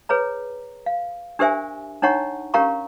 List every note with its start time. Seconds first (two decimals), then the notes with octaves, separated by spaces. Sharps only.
0.09 G#4 B4 C#5 A#5
0.86 F5
1.39 D4 G4 A#4 C5 E5 G#5
2.02 D4 D#4 C#5 F#5 A#5 C#6
2.54 C#4 G4 A#4 F5 A#5 C#6